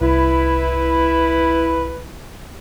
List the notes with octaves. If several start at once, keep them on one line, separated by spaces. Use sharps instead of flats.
C2 E4 B4